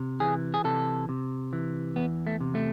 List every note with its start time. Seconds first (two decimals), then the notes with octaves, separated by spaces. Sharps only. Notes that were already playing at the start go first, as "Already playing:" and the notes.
Already playing: C3
0.20 E3 G#4
0.54 G#4
0.65 C3 A4
1.09 C3
1.53 E3
1.96 E2 B3
2.27 A3
2.41 C3
2.55 A3